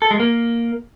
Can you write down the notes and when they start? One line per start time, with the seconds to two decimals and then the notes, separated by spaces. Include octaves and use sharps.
0.02 A4
0.11 G#3
0.20 A#3